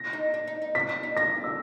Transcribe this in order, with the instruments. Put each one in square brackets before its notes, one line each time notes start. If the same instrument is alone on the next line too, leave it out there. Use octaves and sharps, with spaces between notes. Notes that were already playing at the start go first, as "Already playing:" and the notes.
Already playing: [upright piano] A#6
[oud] D#4
D4
D#4
D#4
[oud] D4 [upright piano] B6
[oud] D4
D#4
[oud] D4 [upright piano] A#6
[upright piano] E6